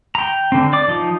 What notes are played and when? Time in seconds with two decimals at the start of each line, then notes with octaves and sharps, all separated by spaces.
0.15 G5 A#5
0.52 D3 C4
0.73 D5 D6
0.88 F3 D#4